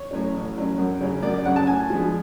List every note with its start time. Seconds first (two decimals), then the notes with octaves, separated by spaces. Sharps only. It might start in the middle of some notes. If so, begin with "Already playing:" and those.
Already playing: C#5
0.11 A2 F#3 C#4
0.34 A1
0.56 A2 F#3 C#4
0.78 F#2
1.01 C#3 F#3 C#4
1.22 F#2 D5
1.34 D5
1.45 C#3 F#3 C#4 F#5
1.56 A5
1.67 A2 G#5
1.90 F3 G#3 B3 D4